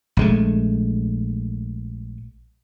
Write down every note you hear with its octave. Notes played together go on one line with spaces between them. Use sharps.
A#1 G#3 A3